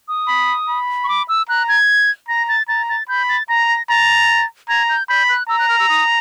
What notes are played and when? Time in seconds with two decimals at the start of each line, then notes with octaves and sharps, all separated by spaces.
0.08 D#6
0.28 B5
0.68 B5
1.04 C#6
1.09 D6
1.29 E6
1.49 A#5 F#6
1.68 G#6
2.28 A#5 A#6
2.49 A6
2.68 A#5 A6
2.89 A6
3.08 B5 G6
3.29 A6
3.49 A#5 A#6
3.69 A#6
3.89 A#5 A6
4.69 A#5 G#6
4.89 G6
5.09 B5 G6
5.29 F#6
5.49 A#5 E6
5.59 F#6
5.69 F6
5.80 E6
5.89 D#6